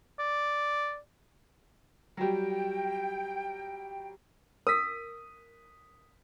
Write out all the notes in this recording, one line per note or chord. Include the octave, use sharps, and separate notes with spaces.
D5
F#3 G3 G5
A#4 D#6 B6